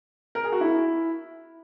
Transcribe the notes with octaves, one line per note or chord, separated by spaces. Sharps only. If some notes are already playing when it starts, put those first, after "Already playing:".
A#4
G#4
F#4
E4